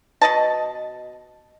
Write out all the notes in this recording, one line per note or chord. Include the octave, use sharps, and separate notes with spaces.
B2 D#5 A5